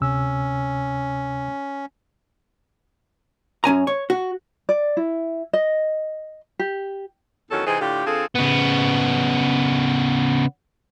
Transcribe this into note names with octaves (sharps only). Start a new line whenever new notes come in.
D2 C3 C#4 E6
F#2 C#4 G#5 A#5
C#5
F#4
D5
E4
D#5
G4
E2 D#3 F#3 C#4 F#4 A4
C3 E3 C4 D#4 G#4
A2 D3 F4 G4
D3 C4 F4 G#4 A4
C#3 B3